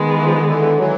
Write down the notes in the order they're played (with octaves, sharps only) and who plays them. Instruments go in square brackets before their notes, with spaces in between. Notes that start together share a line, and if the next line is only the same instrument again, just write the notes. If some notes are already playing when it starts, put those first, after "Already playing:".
Already playing: [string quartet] D#3 G#3 B3
[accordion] E3
F3
D3 E3
D3 E3
E3 F#3